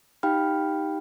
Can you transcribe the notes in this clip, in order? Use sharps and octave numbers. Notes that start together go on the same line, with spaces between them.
D#4 G4 F5 G5 B5 F6